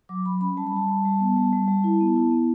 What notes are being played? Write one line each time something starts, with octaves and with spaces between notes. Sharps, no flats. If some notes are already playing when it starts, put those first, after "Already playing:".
F#3 D6
F#3 B5
C#4 B5
G3 A5
B5
G3 A5
G3
G3
B3
G3
G3
G3
E4
B3
E4
B3